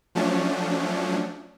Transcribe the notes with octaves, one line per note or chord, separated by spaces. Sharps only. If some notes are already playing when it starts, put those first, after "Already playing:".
F3 F#3 A3 C#4 D4